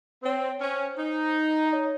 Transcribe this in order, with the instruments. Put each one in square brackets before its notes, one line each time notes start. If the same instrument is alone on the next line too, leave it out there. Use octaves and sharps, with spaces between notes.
[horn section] C4 [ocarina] C#5
[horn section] C#4 [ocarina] C5
[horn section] D#4
[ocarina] D#5
C#5